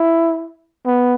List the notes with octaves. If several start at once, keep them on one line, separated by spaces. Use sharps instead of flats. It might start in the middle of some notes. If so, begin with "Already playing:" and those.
Already playing: E4
B3